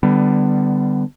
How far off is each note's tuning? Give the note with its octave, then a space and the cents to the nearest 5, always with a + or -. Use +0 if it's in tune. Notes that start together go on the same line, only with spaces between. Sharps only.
D3 +20 G3 +0 B3 +25